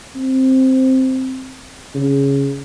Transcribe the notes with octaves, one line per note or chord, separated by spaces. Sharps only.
C4
C#3